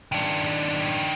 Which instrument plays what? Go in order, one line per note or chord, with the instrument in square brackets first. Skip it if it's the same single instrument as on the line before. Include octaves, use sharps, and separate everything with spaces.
[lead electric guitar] D#3 D4